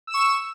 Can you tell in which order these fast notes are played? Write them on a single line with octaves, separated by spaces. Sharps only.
E6 E7 C#6